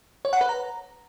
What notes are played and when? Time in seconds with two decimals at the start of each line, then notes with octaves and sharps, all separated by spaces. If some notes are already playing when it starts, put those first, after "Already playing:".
0.25 C#5
0.33 F#5
0.41 B4
0.49 A#5